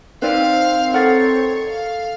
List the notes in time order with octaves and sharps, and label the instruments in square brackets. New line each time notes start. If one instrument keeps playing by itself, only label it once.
[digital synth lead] C4 [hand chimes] D#4 A#4 [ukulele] B4 D5 [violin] F5
[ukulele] D#4 A#4 F#5 [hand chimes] A4 A6 C7 [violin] C#5
[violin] F5